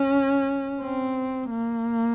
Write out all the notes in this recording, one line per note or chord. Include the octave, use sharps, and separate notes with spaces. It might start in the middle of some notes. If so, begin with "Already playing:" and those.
Already playing: C#4
C4
A#3